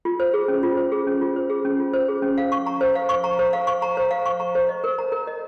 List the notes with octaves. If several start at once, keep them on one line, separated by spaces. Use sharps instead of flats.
F4
C5
G#4
C#4
F4
C5
G#4
C#4
F4
C5
G#4
C#4
F4
C5
G#4
C#4
F5
C#6
A#5
C5
F5
C#6
A#5
C5
F5
C#6
A#5
C5
F5
C#6
A#5
C5
D#5
A#4
A#5
A#4
D#5